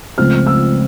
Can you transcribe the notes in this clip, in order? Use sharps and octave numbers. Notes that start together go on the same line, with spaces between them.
C#2 C#3 F3 A3 C4 F6
E6